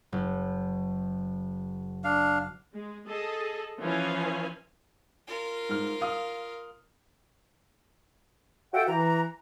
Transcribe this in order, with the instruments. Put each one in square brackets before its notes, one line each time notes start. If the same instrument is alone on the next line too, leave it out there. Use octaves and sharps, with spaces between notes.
[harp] F#1
[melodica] D4 F5
[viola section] G#3
G#4 A4 D#5
E3 F3 C#4 C#5 F5 G#5
[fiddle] F4 A#4
[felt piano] G#2 F6
F5 D#6 F6
[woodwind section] F4 F#4 A4 E5 F#5 G5
E3 A#5